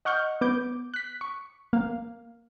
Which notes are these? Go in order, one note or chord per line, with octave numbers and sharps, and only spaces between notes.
D#5 F#5 C#6 F6 G6
B3 D6 G6
F#6 B6
C#6
A#3 F5